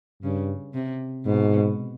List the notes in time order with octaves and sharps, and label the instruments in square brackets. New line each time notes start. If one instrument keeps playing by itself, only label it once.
[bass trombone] G2 [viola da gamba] C#3
[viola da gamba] C3
[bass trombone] G#2 [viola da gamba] B2